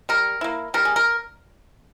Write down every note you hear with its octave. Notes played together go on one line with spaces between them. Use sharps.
G3 A#4
A#3 E4
G3 A#4
G#4
A#4